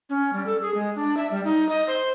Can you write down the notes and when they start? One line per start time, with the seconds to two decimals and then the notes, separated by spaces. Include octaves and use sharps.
0.10 C#4
0.33 G3
0.46 A4
0.62 G#4
0.74 G#3
0.96 D4
1.17 E5
1.31 G3
1.44 D#4
1.69 D#5
1.87 C5